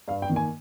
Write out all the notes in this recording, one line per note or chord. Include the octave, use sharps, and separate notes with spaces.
G2 F5
G5
D#3 A#3
G#5